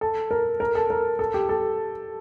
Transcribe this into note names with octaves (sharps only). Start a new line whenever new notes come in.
A4
A#4
A#4
A4
A#4
A4
G4
A4